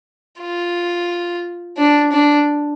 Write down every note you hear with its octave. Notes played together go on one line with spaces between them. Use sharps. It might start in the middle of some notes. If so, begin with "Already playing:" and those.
F4
D4
D4